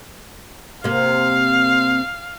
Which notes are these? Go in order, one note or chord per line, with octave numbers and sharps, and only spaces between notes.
C3 A#3 F5